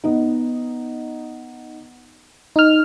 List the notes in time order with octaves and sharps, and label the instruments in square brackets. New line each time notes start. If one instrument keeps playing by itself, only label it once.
[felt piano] B3 D#4
[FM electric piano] D#4 F6